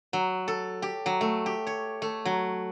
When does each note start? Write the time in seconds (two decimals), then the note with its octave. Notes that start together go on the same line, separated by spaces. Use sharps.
0.13 F#3
0.48 A4
0.82 G4
1.06 F#3
1.21 A3
1.46 G4
1.67 C#5
2.02 A3
2.25 F#3